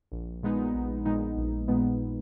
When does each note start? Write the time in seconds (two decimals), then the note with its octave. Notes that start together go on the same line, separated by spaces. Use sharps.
0.12 A#1
0.43 A#2 G#3 B3 D#4
0.74 A#1
1.05 A#2 G#3 B3 D#4
1.37 A#1
1.68 A#2 G#3 B3 D#4